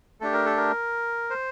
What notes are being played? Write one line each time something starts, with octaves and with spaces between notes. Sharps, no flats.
A3 D4 G4 A4
A#4
A4
A#4
C5